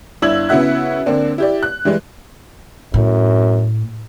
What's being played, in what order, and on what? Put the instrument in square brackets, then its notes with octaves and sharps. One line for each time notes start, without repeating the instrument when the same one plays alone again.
[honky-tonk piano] G1 D4 E4 E6 G#6 F#7
C#3 B3 E4 F#4 E5 F#6
D3 A#3 C4 D4
E4 G4 D5
F#6
E3 G3 G#3
[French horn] F#2 [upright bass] A2